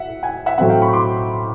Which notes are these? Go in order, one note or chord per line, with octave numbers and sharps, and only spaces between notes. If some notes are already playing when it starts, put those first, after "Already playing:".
Already playing: E5 F#5
F#5 G#5
E5 F#5
A2 F#3 A3 C4 E5 F#5
F5 G5
B5 C#6
C6 D6